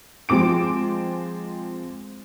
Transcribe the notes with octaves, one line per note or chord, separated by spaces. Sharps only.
F3 G#3 C4 D6 D7